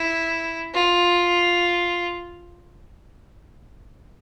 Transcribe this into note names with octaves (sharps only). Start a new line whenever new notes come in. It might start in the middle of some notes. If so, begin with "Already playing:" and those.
Already playing: E4
F4